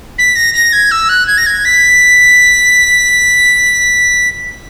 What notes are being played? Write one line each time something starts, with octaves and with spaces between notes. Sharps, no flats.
B6
A#6
A#6
G#6
E6
F#6
G#6
A#6
G#6
B6